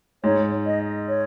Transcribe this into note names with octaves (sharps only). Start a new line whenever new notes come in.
G#2 C#5
D#5
C#5